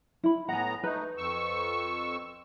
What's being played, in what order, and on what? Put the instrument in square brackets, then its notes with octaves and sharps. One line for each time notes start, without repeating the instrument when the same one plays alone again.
[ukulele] E4 B5
[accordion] A2 B3 A#5 [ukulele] F#5 G#5
[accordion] A3 D#4 [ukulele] B4
[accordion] F2 C#6 E6